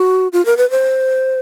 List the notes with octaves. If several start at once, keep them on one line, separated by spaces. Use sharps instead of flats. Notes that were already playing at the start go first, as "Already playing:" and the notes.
Already playing: F#4
F4
A#4
B4
C5